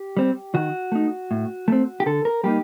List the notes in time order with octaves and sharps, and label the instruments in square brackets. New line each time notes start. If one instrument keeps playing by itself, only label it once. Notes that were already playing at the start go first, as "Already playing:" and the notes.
Already playing: [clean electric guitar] G4
G3 C4
D#3 F#4
A3 D#4
A2
A3 C4
G4
D3 A4
A#4
G3 A#3 D#4 G4